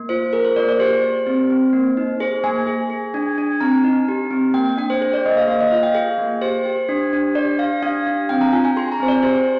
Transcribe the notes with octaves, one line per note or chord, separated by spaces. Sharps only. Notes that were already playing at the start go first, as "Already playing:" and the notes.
Already playing: A#3
F4 C5
G#4 A#4
C5
A#3 D5
D5
G4 C5
G4
C4
C4
A#3
D#4
G#4 C5
A#3 G#5
G#4
G#4
D4
D4
C4 A#5
D#4
G4
C4
A#3 G5
D4 G5
C5
G#4 C5
D5
A#3 D#5
F5
A#3 F5
D#5
F4 F5
G5
G#4
A#3
G4 C5
G4
D4
D4
G4 D5
G4 F5
D4 F5
D4
C4 G5
A#5
F4 G#5
G#5
G#4 C6
A#5
C4 C5
D5
G4 C5